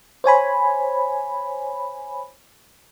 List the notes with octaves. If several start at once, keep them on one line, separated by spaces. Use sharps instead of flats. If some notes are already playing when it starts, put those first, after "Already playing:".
C5 C#5 G#5 B5